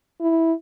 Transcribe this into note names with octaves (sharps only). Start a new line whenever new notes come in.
E4